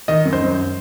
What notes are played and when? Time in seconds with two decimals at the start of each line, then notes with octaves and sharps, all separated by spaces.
0.08 D#3 D#5
0.25 F#2
0.33 C5
0.42 F#2